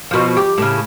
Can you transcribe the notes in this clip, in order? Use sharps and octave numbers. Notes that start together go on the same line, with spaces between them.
B2 F3
G4
A2 C#3